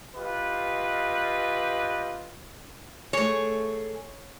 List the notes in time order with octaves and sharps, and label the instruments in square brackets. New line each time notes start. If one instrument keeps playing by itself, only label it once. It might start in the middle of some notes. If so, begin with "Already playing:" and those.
[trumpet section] F4 G4 B4 D#5
[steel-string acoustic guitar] A3 G#4 [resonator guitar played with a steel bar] C#5